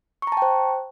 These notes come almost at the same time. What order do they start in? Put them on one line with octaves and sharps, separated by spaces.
C#6 A#5 A5 G5 C5